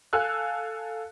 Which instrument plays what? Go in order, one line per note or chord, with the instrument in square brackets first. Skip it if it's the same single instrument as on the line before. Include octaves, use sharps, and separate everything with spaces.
[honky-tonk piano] A4 F5 G#5 E6 F#6